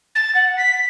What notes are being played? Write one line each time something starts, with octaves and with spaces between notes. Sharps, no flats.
A6
F#5
B6